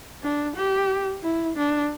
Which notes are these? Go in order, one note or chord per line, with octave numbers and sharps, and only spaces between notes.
D4
G4
E4
D4